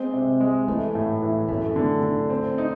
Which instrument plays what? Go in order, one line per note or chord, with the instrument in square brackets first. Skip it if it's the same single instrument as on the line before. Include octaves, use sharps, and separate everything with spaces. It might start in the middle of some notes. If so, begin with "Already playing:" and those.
Already playing: [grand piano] G#3 [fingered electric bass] C4
[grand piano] C3
G#3
[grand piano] E3 [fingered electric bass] A3
[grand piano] A2
E3
[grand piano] F#2 [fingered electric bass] A3
[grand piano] D3
D3
C4
D#4